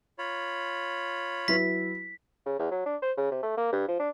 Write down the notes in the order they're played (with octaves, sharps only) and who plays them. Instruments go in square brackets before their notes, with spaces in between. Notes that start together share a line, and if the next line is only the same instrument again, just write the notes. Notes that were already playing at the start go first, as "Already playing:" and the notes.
[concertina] F4 C#5 B5
[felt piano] F#3 E4 B4 [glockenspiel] B6
[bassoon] C#3
E2
F#3
D4
C5
C#3
C3
A3
A#3
G2
F3
D4